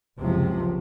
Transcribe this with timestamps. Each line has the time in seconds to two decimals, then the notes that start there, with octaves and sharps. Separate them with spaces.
0.20 F#1 C#2 C3 F3